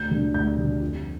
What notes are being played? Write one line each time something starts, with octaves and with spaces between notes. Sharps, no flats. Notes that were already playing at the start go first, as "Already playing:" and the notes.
Already playing: D2 G6
D3 G3 D4
D2 G6
D3 G3 D4
F2